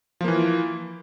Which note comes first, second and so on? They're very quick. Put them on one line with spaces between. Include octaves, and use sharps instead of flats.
F3 A#3 E3